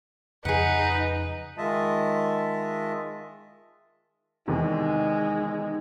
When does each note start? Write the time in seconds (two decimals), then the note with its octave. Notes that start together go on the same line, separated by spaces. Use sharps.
0.45 F2 C#3 F3 D#4 G#4 B4 F#5
1.58 D#3 G#3 F4 D#5 E5 A5
4.48 E2 C3 D#3 G#3 D#4
5.42 D#4